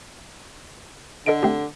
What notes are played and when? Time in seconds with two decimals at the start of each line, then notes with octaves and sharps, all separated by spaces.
1.26 D3 A4 D#5 D7
1.43 A3 C4 G4